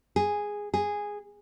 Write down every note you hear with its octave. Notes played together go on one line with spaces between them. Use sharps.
G#4
G#4